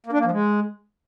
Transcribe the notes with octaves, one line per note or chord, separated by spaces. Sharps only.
A#3
D4
A#3
F3
G#3